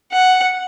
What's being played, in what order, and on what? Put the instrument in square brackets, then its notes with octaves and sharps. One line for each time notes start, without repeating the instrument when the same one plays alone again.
[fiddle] F#5